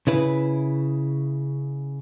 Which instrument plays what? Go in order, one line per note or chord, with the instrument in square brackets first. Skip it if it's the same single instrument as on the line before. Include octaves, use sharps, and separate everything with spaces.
[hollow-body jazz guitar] C#3 E4 B4